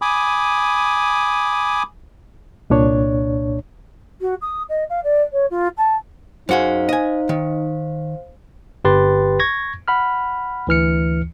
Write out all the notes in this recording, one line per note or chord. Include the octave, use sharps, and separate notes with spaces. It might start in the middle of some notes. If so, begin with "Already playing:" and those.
G#5 B5 D6 D#6
C2 A#2 D4 C#5
F#4
D#6
D#5
F5
D5
C#5
F4
A5
F#2 D#4 F#4 G#4 C5 F5
D#5 G#5
D#3
G1 G4 B4 G5 C6 A6
C#6 G#6 A#6
F#5 B5 F6
D2 E3 F6 C#7